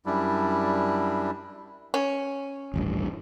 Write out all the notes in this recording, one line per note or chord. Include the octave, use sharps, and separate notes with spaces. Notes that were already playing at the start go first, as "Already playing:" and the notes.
F#2 G3 D4 E4
C#4
D#1 A1 G2